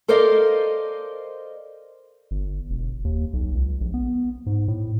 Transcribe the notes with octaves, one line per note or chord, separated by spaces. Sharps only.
A4 A#4 C5 D5 D#5 F5
G1
E1
D#2
B1
C#2
A#1
B3
G#2
A2